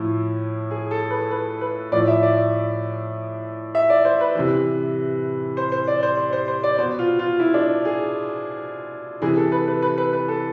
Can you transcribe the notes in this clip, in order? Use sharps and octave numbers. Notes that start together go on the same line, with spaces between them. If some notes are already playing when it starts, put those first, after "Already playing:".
Already playing: A2 F3 E4
G#4
A4
B4
B4
B4
A2 F3 D5
E5
D5
E5
D5
C5
B4
C3 E3
C5
C5
D5
C5
C5
C5
C5
D5
B2 C5
F4
F4
E4
D4
G#4
C3 E3 G#4
A4
B4
B4
B4
B4
B4
A4